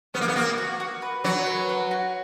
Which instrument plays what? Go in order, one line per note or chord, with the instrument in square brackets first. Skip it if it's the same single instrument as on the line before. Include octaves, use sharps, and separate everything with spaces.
[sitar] B3 [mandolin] C#4
[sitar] A#3
B3
[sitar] A#3 [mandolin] F#4
[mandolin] F#4
F#4
B4
[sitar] F#3 [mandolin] F#4
[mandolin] B4
F#5
F#4